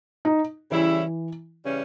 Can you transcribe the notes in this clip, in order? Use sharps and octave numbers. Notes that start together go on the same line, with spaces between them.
D#4
C#3 E3 G3 C#4 E4
C#3 E3 G3 C#4